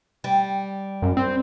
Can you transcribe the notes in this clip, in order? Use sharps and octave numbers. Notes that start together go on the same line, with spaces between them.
G3
F#2
C4